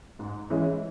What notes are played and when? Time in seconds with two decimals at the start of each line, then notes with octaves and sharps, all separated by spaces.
0.19 G#2
0.50 E3 G#3 C#4 E4